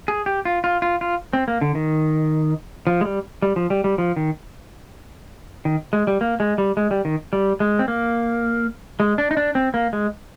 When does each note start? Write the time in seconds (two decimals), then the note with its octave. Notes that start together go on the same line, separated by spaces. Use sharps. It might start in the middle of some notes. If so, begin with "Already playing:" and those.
0.08 G#4
0.26 G4
0.45 F4
0.64 F4
0.82 F4
1.01 F4
1.33 C4
1.48 A#3
1.61 D3
1.75 D#3
2.87 F3
3.01 G#3
3.05 G3
3.42 G3
3.56 F3
3.70 G3
3.84 G3
3.98 F3
4.16 D#3
5.65 D#3
5.93 G#3
6.07 G3
6.21 A#3
6.40 G#3
6.58 G3
6.77 G#3
6.91 G3
7.05 D#3
7.33 G3
7.60 G#3
7.79 C4
7.88 A#3
9.00 G#3
9.18 D4
9.31 D#4
9.37 D4
9.55 C4
9.74 A#3
9.93 G#3